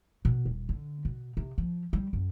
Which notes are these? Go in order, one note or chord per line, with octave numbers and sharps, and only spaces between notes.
B2
D#1
D3
B2
C3
F3
G3
F#2